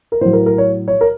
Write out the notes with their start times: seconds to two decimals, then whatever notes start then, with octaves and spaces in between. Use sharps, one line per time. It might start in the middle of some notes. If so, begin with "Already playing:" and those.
0.12 A#4
0.21 A2 F#3 C5
0.33 A#4
0.46 A#4
0.58 C#5
0.88 C#5
1.01 A#4